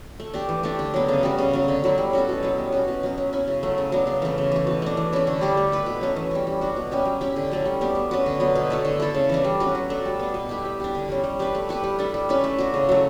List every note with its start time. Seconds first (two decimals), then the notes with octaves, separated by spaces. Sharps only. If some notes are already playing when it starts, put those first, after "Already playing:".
0.20 A3
0.34 D4 G4
0.49 E3
0.63 A3 D4 G4
0.79 D3
0.94 F#3 B3
1.08 C#3
1.23 G3 C#4 F#4
1.38 C#3
1.53 F#3 C#4
1.68 D3
1.84 F#3 A3 E4
1.98 G3
2.13 C#4 F#4 A4
2.29 B2
2.43 F#3 B3
2.58 G3
2.72 C#4 F#4
2.88 B2
3.03 F#3 C#4
3.18 F#3
3.33 C#4 E4
3.48 C#3
3.63 F#3 A3
3.78 C#3
3.92 F#3 B3 D4
4.07 C#3
4.22 E3 A3 C#4
4.38 C#3
4.52 E3 A3
4.67 B2
4.82 A3 D4
4.97 E3
5.13 A3 C#4 E4
5.27 D3
5.41 G3 D4 G4
5.57 A3
5.72 E4 B4
5.86 B2
6.01 F#3 A3 C#4
6.16 E3
6.31 G3 C#4
6.47 G3
6.61 D4 F#4
6.76 B2
6.91 G3 C#4 G4
7.05 F#3
7.21 C#4 E4 G4
7.36 D3
7.51 F#3 A3 C#4
7.66 G3
7.81 B3 D4 G4
7.95 A3
8.11 C#4 F#4 B4
8.26 D3
8.40 F#3 B3
8.55 B2
8.70 A3 E4 A4
8.85 D3
9.00 A3 E4 A4
9.15 C#3
9.29 E3 A3 D4
9.45 G3
9.60 C#4 F#4 B4
9.75 F#3
9.90 A3 D4 A4
10.05 G3
10.19 B3 D4
10.34 B2
10.49 A3 E4 G4
10.65 G3
10.80 D4 G4
10.95 D3
11.09 G3 C#4
11.24 G3
11.39 D4 G4 B4
11.55 A3
11.69 E4 G4 B4
11.84 G3
11.99 D4 A4
12.14 G3
12.29 C#4 E4 B4
12.44 A3
12.58 D4 F#4
12.74 C#3
12.89 F#3 A3